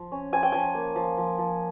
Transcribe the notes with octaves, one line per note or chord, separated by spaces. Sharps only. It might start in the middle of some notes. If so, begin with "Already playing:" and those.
Already playing: F3
C#4
F3 G#5
G5
F3 G#5
A#3
F3
F3
F3